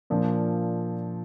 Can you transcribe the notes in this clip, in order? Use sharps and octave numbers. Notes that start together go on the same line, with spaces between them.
A#2 F3 A#3 D4